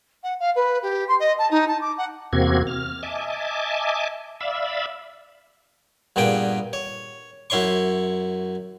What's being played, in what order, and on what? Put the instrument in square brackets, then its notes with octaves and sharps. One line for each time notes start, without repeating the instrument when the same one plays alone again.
[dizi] F#5
F5
B4
G4
C6
D#5
A5
D#4
A5
D6
F#5
[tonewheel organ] E2 C3 A#3 C4 F#4 G#6
F6
D#5 E5 G#5 A5 D6
D5 E5 F5 B5 E6
[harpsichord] G2 A#2 B3 G#4 G5
C#5
F#2 E4 C#5 C6 C#6